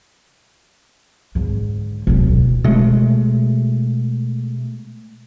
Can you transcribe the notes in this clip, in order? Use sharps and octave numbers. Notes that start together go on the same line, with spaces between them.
G#2 D3
D1 B1
B2 G#3 A3